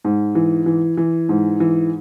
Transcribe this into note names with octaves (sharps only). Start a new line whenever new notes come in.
G#2
E3
E3
E3
G#2
E3